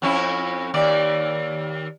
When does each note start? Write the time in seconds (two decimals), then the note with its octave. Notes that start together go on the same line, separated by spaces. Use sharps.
0.02 F2 C#4 E4
0.74 D#2 D5